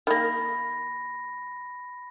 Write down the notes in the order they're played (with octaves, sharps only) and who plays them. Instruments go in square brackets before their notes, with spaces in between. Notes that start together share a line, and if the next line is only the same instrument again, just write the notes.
[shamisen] D#3 A#3 [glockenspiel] B5 A#6